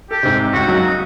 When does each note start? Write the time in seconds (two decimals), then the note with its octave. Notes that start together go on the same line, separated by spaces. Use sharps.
0.11 G4 A4
0.23 G#2 C3
0.53 C#2 F#4
0.67 F#2 F#3 D#4
0.88 D#6